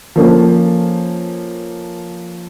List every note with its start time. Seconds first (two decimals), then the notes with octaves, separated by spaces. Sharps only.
0.16 F3 A#3 C#4 A4